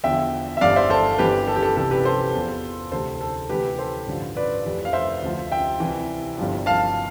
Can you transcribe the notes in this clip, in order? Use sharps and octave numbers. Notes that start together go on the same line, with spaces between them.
E2 D3 F3 E5 G5
E5
G1 G2 E3 D5 F5
C5 E5
A4 C5
G1 G2 E3 G4 B4
A4
G4
A4
C2 C3 E3 A4
G4 B4
A4 C5
E2 C3 F3
D2 C3 E3 A4 C5
A4
D2 C3 E3 G4 B4
A4 C5
A1 G2 D3 F3
B4 D5
F1 F2 C3 E3
F5
C5 E5
D2 D3 F3
E5 G5
C2 C3 E3
G1 G2 F3
F5 A5